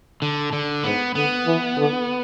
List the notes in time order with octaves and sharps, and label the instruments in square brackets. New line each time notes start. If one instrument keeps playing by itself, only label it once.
[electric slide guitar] D3
D3
[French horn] G#2 [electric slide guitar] B3
[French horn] D3 [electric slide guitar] B3
[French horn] E3
D3